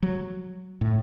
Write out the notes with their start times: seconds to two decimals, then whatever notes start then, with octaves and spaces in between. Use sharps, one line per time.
0.03 F#3
0.81 A2